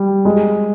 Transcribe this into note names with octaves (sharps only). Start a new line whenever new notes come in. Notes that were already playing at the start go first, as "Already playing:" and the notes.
Already playing: G3
G#3